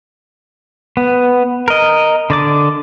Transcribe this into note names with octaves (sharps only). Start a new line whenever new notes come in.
B3
A#4 D#5
D3 D5 D6